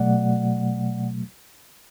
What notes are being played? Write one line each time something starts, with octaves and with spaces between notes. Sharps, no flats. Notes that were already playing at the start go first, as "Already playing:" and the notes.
Already playing: B2 F#3 A3 D5 F#5